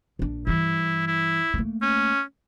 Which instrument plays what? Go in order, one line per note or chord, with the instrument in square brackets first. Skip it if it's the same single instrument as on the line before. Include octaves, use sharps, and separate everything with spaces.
[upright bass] A#1 D4
[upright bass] G2 E3 [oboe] E4
[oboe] E4
[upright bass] A3 A#3
[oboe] C#4